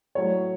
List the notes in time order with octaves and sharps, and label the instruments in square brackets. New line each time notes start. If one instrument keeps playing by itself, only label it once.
[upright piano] A2 F#3 C#5